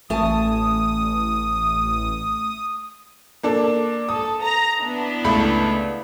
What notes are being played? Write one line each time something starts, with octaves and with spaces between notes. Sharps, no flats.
A1 A3 G#5 A5 D#6
A#3 D4 A4
A4 D#6
A#5
B3 D4 E4
C#2 A3 B5